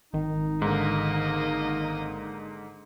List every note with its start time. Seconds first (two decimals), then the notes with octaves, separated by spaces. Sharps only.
0.13 G#1 D#3 D#4
0.62 G#2 D3 A#3 D#5